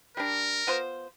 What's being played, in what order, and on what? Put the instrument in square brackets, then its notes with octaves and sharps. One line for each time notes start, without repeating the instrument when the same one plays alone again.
[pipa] G3 D4 [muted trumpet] A#4
[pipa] B3 F4 C5